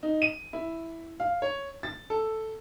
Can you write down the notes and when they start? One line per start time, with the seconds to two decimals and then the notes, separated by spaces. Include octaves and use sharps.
0.03 D#4
0.22 D#7
0.53 E4
1.20 F5
1.42 C#5
1.83 A6
2.10 A4